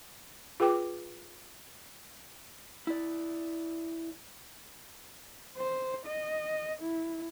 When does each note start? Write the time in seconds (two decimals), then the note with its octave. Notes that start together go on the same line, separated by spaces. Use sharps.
0.60 F4 G#4 B4 G5 D6
2.87 E4 D5
5.57 C5
6.06 D#5
6.82 E4